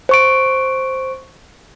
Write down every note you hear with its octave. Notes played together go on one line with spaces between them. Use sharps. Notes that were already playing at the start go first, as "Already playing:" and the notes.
C5 C#6 D7